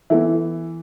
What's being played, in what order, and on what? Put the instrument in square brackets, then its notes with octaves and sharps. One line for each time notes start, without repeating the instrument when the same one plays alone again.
[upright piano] E3 [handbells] B3 E4 A4 E5